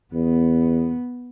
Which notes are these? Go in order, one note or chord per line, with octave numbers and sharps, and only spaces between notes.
E2 B3